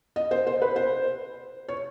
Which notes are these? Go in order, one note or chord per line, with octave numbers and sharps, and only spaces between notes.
D#5
C5
C5
B4
C5
C#5